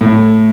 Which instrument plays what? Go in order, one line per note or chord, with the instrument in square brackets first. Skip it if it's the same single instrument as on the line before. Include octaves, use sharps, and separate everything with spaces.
[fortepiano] A2